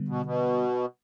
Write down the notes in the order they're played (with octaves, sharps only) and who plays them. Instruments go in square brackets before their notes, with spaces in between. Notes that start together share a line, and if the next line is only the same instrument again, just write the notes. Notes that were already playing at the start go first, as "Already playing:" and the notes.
Already playing: [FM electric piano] D3 G3 B3
[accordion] B2
B2